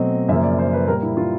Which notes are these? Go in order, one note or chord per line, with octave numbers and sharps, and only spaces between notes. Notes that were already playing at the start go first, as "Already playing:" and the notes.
Already playing: B2 F#3 A3 C4 D#5
F#2 C#3 F3 A#3 E5
D5
C5
B4
A#2 G3 A#3 A#4
E4
F4